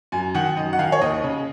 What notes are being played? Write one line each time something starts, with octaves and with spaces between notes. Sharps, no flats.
F#2 G#5
D#3 F#5
F#2 D#5
F#5
D#3 F5
C#5
D#2 D#5
C#3